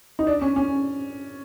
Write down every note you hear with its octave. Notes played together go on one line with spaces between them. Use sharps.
D#4
D4
C#4
C#4